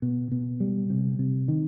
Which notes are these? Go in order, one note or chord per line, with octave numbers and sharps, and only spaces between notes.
B2
B2
G3
C3
C3
D#3